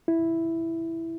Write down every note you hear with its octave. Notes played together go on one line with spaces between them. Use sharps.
E4